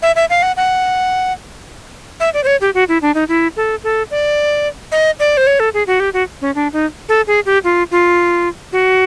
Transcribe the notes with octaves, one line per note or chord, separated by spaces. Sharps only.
E5
E5
F5
F#5
F#5
E5
D5
C5
C#5
G4
F#4
E4
D4
D#4
E4
A4
A4
D5
D#5
D5
C5
C#5
A4
G#4
F#4
G4
F#4
C#4
D4
D#4
A4
G#4
G4
F4
F4
F#4